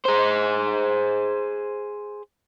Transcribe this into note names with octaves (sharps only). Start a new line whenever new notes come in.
G#4 C5